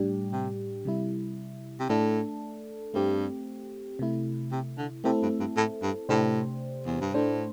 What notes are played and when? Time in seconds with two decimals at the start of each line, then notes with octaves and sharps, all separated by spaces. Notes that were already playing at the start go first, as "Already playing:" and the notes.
Already playing: A2 G3 D4 G4
0.32 C3
0.85 C3 G3 E4
1.80 C3
1.89 A2 A3 D4 A4
2.94 G2 A3 C4 G4
3.99 C3 A3 E4
4.52 C3
4.78 D3
5.04 C3 A3 C4 E4 A4
5.22 G2
5.40 G2
5.57 A2
5.83 G2
6.09 A2 C3 A3 D4 G4 C5
6.86 E2
7.01 G2
7.14 A2 A3 D4 C5